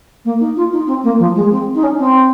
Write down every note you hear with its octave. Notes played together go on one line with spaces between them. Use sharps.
A#3
D#4
F4
D#4
C4
A#3
F3
G#3
C4
D#4
C#4
C4